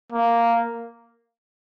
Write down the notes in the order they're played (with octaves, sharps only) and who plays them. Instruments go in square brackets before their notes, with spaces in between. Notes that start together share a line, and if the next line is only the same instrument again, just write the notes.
[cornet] A#3